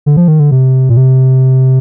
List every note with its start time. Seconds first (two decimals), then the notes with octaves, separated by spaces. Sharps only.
0.06 D3
0.17 F3
0.28 D#3
0.40 D3
0.51 C3
0.89 A#2
0.97 C3